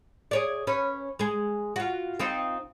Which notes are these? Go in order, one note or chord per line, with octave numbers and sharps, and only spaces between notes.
G#4 C#5 D5
C#4 B4
G#3 G#4
F4 F#4
C4 D#4 F4